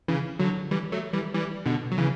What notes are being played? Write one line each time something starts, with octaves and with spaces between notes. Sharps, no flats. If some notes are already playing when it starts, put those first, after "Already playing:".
C#3 E3
D3 F#3
E3 G3
F#3 A3
E3 G3
E3 G3
B2 D3
F#3
C#3 E3